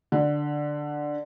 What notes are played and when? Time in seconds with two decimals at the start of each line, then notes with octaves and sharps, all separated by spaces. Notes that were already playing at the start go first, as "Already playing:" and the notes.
0.12 D3